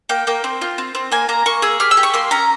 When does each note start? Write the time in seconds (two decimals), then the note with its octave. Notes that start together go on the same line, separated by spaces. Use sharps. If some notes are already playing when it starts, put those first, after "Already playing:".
0.09 A#3 G5
0.27 A#3 G5
0.44 C4
0.61 F4
0.78 C4
0.95 C4
1.12 A#3 G#5
1.29 A#3 A#5
1.46 A#3 C#6
1.62 G#4 E6
1.80 G4 F6
1.91 E6
1.97 G4
2.03 C#6
2.14 A#3 C6
2.31 C#4 A#5